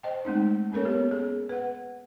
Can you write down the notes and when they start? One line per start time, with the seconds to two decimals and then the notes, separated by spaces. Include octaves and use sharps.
0.03 C5 D#5 G5
0.25 G#3 A3 C4 D#4
0.72 A#3 C#4 A4 A#4 C#5
0.85 B3 G4
1.11 G#4
1.49 B4 F#5